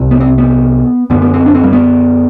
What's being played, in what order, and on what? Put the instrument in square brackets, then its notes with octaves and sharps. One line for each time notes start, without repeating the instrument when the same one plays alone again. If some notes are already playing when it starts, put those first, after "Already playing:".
Already playing: [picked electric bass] C2 C3
B3
C4
B3
F#2 D3 B3
B3
C4
D4
C4
G3
B3